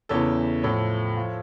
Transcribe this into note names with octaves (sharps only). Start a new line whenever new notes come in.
E2 C#3 E3 A4 C#5
A2 F3 A4 C#5
F3